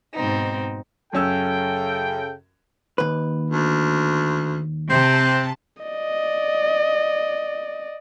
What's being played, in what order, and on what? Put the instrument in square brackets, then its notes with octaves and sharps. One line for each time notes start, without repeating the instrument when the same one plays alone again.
[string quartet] G#2 B2 C4 D#4
[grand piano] F#2 C#4 E6 [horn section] C#3 A4 G5
[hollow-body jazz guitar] D#2 B4
[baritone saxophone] D2
[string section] C3 A5 [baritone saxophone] C4
[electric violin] D5 D#5